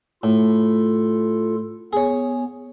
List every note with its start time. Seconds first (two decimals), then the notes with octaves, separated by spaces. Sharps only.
0.23 A2 F4 A4
1.93 B3 G#4 C#5